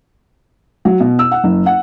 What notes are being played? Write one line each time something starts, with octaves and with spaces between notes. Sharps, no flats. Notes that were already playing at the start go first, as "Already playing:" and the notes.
F#3
B2
E6
F#5
F#1
F#5